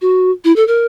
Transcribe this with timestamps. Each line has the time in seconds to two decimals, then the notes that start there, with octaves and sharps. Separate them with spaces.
0.02 F#4
0.44 E4
0.56 A4
0.68 A#4